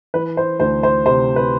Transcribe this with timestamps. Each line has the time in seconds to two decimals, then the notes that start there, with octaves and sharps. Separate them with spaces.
0.14 E3 B4
0.37 C5
0.60 D2 C5
0.83 C5
1.06 C3 C5
1.36 B4